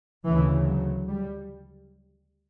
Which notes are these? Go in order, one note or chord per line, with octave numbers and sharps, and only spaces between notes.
D2 C#3 E3
F#3
G3